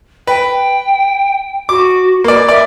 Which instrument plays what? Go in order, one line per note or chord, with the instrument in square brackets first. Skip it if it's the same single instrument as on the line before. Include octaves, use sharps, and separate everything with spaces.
[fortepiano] B4 [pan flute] G5
[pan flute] F#4 [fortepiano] D6
[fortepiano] A#3 D5 [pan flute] B4
[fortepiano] D5 [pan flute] E5